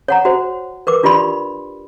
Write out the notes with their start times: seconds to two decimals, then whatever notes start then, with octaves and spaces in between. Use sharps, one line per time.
0.08 C#5 F#5 A#5
0.25 F#4 C5
0.87 A#4 B4 D6
1.03 D4 F4 G4 D5 B5 C6